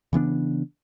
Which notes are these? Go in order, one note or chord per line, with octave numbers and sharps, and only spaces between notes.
C#3 E3 B3 D4